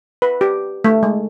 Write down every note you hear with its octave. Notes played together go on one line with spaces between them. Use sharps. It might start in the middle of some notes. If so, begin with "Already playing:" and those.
B4
G4
A3
G#3